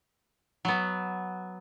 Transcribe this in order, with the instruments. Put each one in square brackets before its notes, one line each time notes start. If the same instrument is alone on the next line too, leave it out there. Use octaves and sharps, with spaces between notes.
[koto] F#3 B3